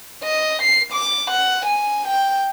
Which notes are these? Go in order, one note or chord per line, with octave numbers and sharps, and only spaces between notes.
D#5
C7
D6
F#5
G#5
G5